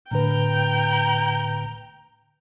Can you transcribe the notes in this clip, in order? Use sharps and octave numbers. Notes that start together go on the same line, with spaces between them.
A2 D3 B4 G5 A#5